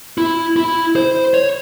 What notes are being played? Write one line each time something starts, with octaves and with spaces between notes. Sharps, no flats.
E4
E4
C5
C#5